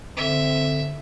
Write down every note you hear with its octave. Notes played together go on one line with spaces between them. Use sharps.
D3 C4 E5